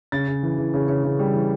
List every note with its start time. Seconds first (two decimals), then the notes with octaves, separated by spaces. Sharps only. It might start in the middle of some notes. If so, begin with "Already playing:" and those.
0.12 C#3 A6
0.28 C#3
0.43 E3
0.58 E3
0.74 C#3
0.88 C#3
1.04 C#3
1.19 G3
1.34 E3